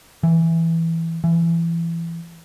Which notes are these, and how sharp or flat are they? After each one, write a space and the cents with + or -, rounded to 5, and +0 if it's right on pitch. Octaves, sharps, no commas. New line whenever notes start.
E3 +0
E3 +25